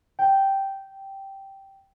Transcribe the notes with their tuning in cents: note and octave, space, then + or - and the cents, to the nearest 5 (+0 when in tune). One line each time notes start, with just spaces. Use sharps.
G5 -5